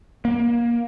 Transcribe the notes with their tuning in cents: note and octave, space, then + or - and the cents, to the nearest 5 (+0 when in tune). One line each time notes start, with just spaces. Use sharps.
A#3 +25